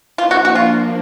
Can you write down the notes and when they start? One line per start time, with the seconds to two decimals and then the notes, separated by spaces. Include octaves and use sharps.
0.18 F3 A#3 D4 F4
0.31 F#4
0.45 F#4
0.55 F4